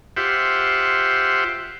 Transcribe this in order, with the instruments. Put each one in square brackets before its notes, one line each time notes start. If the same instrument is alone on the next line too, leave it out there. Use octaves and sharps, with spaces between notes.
[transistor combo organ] F4 G4 C5 E5 F#5